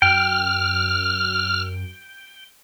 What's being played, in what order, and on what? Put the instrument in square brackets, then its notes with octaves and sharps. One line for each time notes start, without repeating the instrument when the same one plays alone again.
[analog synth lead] F#2 [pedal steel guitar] G5 [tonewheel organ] F6